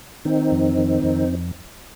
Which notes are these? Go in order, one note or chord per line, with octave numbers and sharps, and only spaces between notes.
D#3 C4 D#4
F2
D#3
F2